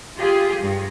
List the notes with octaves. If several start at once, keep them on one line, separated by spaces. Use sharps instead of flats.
F4 G4 G#4
G2